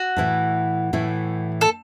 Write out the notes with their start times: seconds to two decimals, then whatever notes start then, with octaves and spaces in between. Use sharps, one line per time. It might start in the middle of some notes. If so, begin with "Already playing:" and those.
Already playing: F#4
0.16 A2 E3 A3 E4
0.93 A2 E3 A3 E4
1.61 A4